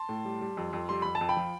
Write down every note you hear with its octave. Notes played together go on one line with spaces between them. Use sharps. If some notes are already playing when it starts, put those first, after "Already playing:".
Already playing: A5 C6
A2
G3
G3
F2
F2
G3 C6
F2 B5
A5
F2
G5 B5
F3